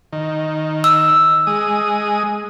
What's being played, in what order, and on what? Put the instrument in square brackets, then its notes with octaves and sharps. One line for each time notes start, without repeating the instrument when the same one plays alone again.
[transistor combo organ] D#3
[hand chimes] E6
[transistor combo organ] G#3 D#6